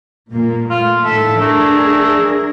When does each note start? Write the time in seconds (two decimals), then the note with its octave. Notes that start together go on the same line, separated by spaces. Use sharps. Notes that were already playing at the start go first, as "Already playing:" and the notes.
0.32 A#2 A#3
0.71 A3 F4
1.04 A2 D#3 A4 E5
1.41 A3 D4 G#4 A#4